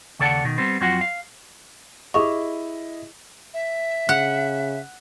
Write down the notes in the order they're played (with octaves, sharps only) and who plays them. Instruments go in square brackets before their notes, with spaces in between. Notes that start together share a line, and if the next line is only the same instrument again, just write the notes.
[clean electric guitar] D#2 C#3 A4 D5 F#5 A5
B2 D#3
G3 B3 C4
F2 F#3 C4 F4 F#4 F#5
F5
[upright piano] E4 D#5 [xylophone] G4 G#4 C#6
[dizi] E5
[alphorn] C#3 [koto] F#5